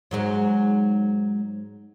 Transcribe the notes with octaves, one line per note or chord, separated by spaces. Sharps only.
G#2 F#3 G#3